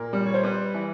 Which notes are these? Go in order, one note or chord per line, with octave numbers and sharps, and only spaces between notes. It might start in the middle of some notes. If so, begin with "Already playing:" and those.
Already playing: A#2 A#4
G3
C#5
C5
G3 B4
E3